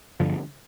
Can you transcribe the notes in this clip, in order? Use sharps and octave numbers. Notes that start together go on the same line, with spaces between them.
G1 G2 D3 F3